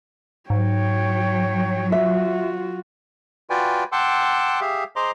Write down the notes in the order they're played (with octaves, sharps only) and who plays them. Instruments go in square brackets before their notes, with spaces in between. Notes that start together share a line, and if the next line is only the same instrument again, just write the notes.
[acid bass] G#2 [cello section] F#3 [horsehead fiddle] C#5 G5
[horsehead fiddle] F4 F#4 [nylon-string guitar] E5
[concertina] F4 F#4 B4 D5 G5 G#5
F#5 G5 A5 C6 D6 E6
G4 G#4 E5 F5
G#4 C5 D#5 A#5 C6 D6